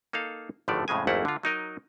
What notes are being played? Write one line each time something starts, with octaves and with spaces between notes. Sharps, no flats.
A#3 D#4 A4 F5
G#1 A2 D3 F3 A3 D5
F2 A2 C#3 G#3 G#5
G#1 F2 A3 A#3 E4 F#5
D3 F4
F#3 D#4 A#4 D#5